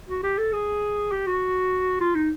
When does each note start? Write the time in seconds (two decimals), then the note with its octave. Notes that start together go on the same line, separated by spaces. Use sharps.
0.09 F#4
0.23 G4
0.38 A4
0.53 G#4
1.12 G4
1.27 F#4
2.01 F4
2.15 D#4